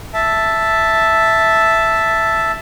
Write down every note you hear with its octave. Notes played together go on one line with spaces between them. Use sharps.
E5 A5